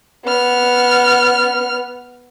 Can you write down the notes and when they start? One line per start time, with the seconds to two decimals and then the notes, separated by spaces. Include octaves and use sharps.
0.25 B3 F6